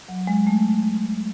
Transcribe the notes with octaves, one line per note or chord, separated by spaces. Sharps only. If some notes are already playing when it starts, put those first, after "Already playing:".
F#3
G#3
A3